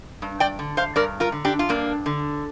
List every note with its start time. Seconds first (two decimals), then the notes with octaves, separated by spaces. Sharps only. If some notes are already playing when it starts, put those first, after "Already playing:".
0.22 G2
0.40 D5 G5
0.59 D3
0.77 C5 F5
0.96 G2 A#4 D5
1.20 F4 A#4
1.32 D3
1.45 D4 G4
1.59 F4
1.69 G2 A#3 D4
2.06 D3